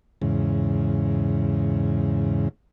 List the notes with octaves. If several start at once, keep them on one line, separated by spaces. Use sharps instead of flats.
E2 G#2 C#3